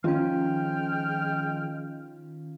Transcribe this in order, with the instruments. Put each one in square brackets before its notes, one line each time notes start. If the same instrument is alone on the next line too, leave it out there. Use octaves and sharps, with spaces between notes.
[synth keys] D#3 C#4 [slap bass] F3 [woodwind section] G#3 G5 F6 [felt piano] F4